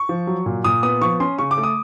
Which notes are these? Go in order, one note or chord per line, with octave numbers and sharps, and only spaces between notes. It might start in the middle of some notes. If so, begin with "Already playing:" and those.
Already playing: C#6
F3
F#3
A#2
A#2 D#6
B3 D#6
F3 C#6
C#4 C6
C#3 C#6
D6
A3
D#6